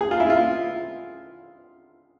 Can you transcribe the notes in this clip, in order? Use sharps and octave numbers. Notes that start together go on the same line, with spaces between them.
G#4
F4
E4
F4